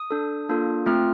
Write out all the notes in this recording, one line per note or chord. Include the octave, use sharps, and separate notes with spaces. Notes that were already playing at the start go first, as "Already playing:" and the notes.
Already playing: D#6
D4 A4
A#3 D4 F4 A4
A3 C4 F4 F6